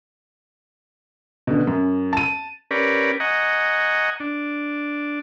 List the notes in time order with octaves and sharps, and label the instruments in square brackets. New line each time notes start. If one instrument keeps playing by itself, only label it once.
[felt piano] B2 D3
F#2
A5 D#7
[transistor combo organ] C#4 G4 A#4 B4 D5
D#5 F#5 G#5 A#5 C#6
D4